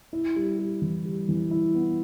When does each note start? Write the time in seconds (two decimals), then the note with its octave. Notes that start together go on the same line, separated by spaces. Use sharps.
0.13 E4
0.36 G3
0.59 G3
0.82 E3
1.05 G3
1.29 E3
1.51 E4
1.75 B3